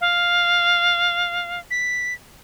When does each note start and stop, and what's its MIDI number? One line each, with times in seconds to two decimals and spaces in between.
0.01 1.60 77
1.71 2.14 95